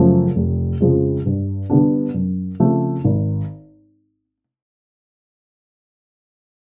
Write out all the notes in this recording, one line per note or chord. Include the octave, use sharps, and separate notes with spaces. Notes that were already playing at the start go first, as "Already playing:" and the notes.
Already playing: F#2 C#3 F3 A3
F1
F2 C#3 F3 G#3
G2
D3 G3 B3 D4
F#2
C#3 F3 A3 C4
G#1